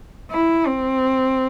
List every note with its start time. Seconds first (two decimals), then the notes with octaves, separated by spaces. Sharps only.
0.31 E4
0.67 C4